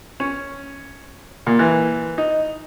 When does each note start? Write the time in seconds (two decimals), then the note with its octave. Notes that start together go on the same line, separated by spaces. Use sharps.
0.20 C#4
1.47 A#2
1.59 E3
2.18 D#4